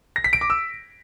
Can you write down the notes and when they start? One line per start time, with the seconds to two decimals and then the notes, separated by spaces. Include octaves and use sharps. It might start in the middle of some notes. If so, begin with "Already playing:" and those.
0.16 A#6
0.24 B6
0.33 D7
0.41 D6
0.50 E6